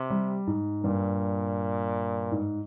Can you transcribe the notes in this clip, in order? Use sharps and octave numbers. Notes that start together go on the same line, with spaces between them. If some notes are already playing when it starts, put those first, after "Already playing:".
Already playing: C3
G3
G#2
G2 A#2
G#2